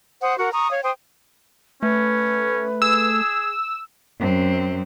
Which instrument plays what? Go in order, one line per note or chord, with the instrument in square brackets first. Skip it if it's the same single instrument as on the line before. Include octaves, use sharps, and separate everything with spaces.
[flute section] C5 F#5 D#6
F#4 A#4 F#5
A#5 C#6 D#6
C#5 F5
C5 G5 D#6
[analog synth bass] A3 [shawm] C#4 [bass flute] B4
[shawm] G#4 [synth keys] E6
[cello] F#2 C4